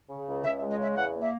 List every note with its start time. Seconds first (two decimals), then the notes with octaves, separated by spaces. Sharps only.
0.09 C#3
0.27 C#2
0.44 C#2 E5
0.57 E5
0.62 G#3
0.70 D#5
0.78 C#3 E5
0.96 E2 F#5
1.13 A#3
1.21 E5